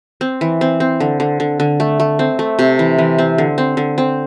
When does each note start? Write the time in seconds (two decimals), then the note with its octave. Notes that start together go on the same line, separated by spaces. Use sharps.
0.21 C4
0.41 E3
0.61 C4
0.80 C4
1.00 D3
1.20 D3
1.40 D3
1.60 D3
1.80 A3
2.00 A3
2.19 C4
2.39 A3
2.59 C3
2.79 E3
2.98 E3
3.18 C4
3.38 D3
3.58 C4
3.77 D3
3.98 C4